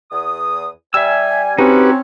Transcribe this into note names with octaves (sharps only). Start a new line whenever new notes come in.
E2 D#6
G3 E5 G#5 E6
C4 C#4 D#4 F#4 G4 B4